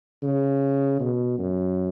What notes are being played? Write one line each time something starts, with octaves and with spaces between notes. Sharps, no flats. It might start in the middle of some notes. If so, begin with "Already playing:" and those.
C#3
B2
F#2